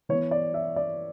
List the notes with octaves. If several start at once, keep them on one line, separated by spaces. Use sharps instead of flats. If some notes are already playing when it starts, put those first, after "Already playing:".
E3 B3 C#5
D5
E5
D5